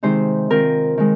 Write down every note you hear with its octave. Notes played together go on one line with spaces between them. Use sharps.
C3 D#3 G#3 D#4 C5
D#3 C4 F4 A#4
D#3 G#3